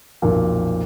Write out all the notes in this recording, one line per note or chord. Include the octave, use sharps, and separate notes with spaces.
B1 F2 A#2